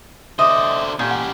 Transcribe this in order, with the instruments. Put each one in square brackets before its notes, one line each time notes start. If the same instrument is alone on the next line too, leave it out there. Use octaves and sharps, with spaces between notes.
[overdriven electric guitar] D3 C5 [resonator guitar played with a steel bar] D#5 [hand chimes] E5 D6
[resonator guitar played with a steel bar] A#2 [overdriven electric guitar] C#4 G4
[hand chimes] F#5